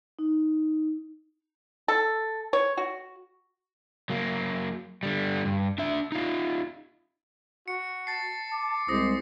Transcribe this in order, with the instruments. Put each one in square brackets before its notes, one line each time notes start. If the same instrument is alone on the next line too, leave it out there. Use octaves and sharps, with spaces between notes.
[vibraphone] D#4
[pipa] A4
C#5
F#4
[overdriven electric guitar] F#3 A#3
D3 G3
G2
D4 E5
D#4 F4
[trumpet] F#4 [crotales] C#7
[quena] A5 [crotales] A6 C7
[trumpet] D6
[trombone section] C2 G#3 [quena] C5 [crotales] D#6 A#6